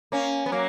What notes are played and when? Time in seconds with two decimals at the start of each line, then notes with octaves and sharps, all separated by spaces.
0.12 A#3 C#4
0.46 B3
0.52 F#3 A#3